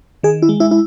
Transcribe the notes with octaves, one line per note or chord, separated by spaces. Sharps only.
D#3 G#4
E4
G#3
E4
E4